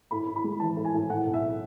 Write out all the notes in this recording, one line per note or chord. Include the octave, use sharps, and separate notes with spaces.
A2 B5
A2
B5
G#3
E3 A5
A2
G#5
A2
A2 F#5
B1
E5